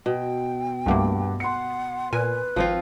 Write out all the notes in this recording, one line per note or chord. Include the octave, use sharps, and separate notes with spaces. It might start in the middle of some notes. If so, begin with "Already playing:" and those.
B2 G5
C2 G2 A3 A#3 F#5 D6
F#5 C6 C#7
A#2 A#4 B4 G#5
G#1 F3 C4 F4